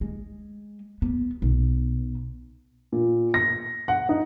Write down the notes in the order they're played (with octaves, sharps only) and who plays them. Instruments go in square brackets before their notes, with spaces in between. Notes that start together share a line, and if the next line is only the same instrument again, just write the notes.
[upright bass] G#3
B3
B1
[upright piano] A#2
A#6
F#5
D#4